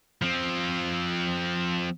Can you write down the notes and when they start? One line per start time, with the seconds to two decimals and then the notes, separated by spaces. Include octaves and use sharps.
0.22 F3 C4